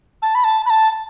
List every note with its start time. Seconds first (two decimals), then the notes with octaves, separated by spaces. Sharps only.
0.22 A5
0.35 B5
0.44 A5
0.66 B5
0.70 A5